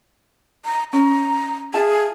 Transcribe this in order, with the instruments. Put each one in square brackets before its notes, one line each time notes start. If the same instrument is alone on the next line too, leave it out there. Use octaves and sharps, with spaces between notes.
[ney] A#5
[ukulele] C#4 [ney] A#5
[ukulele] F4 E5 A5 [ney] G#4